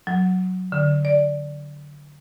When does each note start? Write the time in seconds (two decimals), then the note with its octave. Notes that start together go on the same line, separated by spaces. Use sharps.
0.07 F#3
0.72 D3
1.05 D5